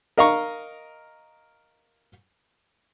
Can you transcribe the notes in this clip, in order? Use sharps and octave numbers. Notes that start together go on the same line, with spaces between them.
A#4 D#5 F5 A#5 C#6